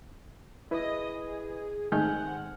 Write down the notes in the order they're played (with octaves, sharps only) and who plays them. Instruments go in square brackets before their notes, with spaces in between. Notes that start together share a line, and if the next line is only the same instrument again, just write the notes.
[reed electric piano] E4 B4 [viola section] G#4 D#5
[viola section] G#4
[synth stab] G#2 D#3 A3 [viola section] C4 F#5 [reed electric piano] G#5 F6 G6